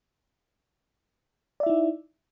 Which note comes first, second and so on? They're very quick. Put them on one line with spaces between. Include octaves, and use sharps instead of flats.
D5 E5 E4 D#4